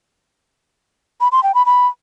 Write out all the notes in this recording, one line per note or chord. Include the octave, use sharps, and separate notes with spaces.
B5
C6
G5
B5
B5